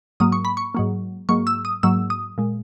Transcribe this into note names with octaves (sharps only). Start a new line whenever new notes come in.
G#2 F#3 A#3 D#6
C#6
B5
C#6
G#2 F#3 A#3
G#2 F#3 A#3 C#6
E6
D#6
G#2 F#3 A#3 E6
D#6
A#2 G#3